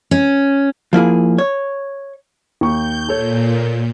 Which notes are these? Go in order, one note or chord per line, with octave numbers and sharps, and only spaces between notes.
C#4
F3 A#3 E4 G#4
C#5
D#2 C#6 G6
A#2 A4 C#5